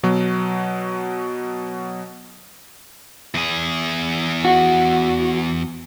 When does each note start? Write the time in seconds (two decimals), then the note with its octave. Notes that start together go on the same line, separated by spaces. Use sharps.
0.03 B2 F#3
3.35 E2 G#4
4.45 F#4